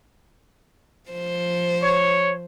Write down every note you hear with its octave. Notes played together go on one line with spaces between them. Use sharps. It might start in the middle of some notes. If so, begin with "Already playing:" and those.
F3 C5
C#5